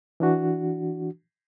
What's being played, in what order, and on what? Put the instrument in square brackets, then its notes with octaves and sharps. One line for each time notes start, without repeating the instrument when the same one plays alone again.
[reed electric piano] E3 D4 F#4